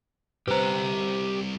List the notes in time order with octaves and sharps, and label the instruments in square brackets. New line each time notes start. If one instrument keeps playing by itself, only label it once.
[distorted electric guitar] C2 [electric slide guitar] G4 A#5 [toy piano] B4 C5